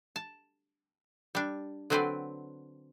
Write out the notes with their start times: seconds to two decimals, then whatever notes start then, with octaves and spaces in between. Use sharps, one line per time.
0.16 A5
1.35 G3 D4
1.90 D3 F#3 C4 B4 C5 D5